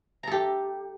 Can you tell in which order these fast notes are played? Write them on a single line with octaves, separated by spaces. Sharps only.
A#5 A4 G4